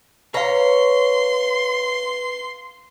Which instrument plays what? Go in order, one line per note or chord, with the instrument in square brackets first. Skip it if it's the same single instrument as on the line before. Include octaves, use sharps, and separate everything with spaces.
[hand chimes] B4 F5 [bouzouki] C#5 A#5 [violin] C6